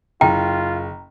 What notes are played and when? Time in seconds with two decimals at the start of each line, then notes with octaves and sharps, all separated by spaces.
0.21 F#1 F4 G5 A#5